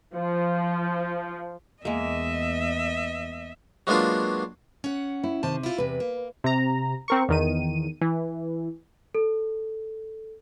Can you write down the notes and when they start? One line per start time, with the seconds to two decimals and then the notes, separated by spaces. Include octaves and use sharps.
0.16 F3
1.85 E2 G#3 A#3 D#5 E5
3.87 F#3 G#3 A#3 B3 D4 F4
4.84 C#4 F#5
5.24 E4
5.43 C3 D#3 C5 A5
5.63 E4 F4
5.78 E2 C3 B4
6.00 A#3
6.44 C3 A#5
7.08 C4 A#4 C#6
7.29 E2 D#3 D#7
8.01 E3
9.15 A4